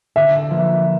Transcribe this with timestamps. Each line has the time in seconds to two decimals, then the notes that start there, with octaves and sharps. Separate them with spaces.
0.16 D3 E5
0.51 F3 A#3